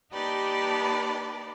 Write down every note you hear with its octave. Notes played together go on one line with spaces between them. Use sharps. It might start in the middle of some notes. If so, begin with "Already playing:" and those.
A#3 D#4 G4 B4 D5 A5